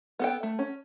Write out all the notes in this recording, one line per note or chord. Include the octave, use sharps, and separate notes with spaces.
B3 A4 G5
A3
C#4